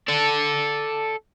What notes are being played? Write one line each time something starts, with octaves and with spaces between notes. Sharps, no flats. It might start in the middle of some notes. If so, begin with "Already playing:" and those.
A4 D5